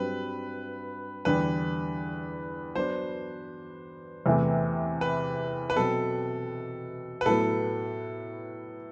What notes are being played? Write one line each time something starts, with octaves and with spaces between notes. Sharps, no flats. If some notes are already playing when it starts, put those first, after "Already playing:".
Already playing: G2 F#3 C4 G4 B4
E2 D3 G3 B4
F#3 B3 D4 C5
E2 C3 E3 A3 E4
B4
B4
B2 F#3 C4 A4
B4
A2 F#3 B3 A4